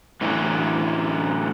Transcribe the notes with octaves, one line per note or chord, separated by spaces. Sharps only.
A2 D3 E3 F#3